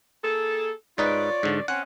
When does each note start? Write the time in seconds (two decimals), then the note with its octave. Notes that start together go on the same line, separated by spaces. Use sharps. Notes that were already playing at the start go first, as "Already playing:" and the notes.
0.24 A#3 G#4 A4
0.98 G#2 D#4 F4 B4 C#5 D5
1.43 G#2 D3
1.68 C4 C#4 F#5